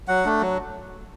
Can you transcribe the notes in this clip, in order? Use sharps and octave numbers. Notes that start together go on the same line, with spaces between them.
F#3 F#5
A3 D4
F#3